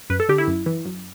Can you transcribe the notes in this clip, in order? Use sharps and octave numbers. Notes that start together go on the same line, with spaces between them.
F#2 B4
A4
D3 G4
E4
F#2
E3
F#2